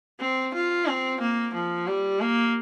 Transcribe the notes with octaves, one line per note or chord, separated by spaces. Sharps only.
C4
F4
C4
A#3
F3
G3
A#3